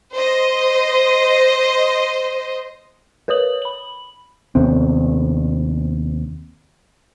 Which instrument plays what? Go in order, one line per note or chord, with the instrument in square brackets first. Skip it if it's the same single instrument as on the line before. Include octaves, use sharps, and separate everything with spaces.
[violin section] C5 D#5
[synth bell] A#4 B4 C#5 D#6 F#7
B5 F#7
[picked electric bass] D#2 C3 B3 C4